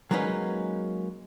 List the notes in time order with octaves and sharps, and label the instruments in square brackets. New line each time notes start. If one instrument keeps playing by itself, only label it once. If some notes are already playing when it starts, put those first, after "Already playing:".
[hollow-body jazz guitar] F#3 G#3 A#3 C#4 D#4 B4